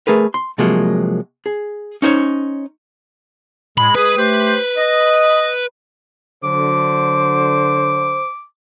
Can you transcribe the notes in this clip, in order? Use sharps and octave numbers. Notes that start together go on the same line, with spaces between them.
A3 G#4 A#4 B4
C6
C3 F3 F#3 G#3 A#3
G#4
C#4 D#4 C5 C#5
A2 G#3 B5
G#3 G#4 B4 D#6
A3 G4 C5
D#5
D3 F#3 C5 D6